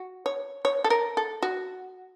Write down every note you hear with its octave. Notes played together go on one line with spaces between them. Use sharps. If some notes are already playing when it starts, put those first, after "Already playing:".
Already playing: F#4
C#5
C#5
A4
A#4
A4
F#4